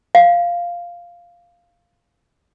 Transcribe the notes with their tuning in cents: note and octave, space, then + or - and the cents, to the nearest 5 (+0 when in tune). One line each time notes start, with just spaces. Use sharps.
F5 -5